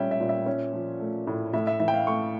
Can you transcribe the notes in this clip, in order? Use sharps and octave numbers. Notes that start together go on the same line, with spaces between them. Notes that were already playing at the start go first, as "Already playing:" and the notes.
Already playing: A#2 G3 C#4 E5 G5
E5
A#2
E5
C#4
F3
A3
A2
A2 E5
E5
E3 E5
G5
F5
A3 C#6